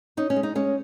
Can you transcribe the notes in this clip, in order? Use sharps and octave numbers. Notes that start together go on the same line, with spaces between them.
C#4 D#4
C#4
G#3
D#4
G#3 C#4